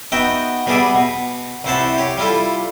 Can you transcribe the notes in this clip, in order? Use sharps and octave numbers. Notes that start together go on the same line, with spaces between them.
B3 D#4 F#4 E5 G5
B2 G3 B3 G#4 D5 E5
B2
C2 C3 E4 C5 F#5 A5
G4 C#5
G3 E4 F4 A4